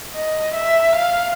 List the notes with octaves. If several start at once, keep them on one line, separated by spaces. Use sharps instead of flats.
D#5
E5
F5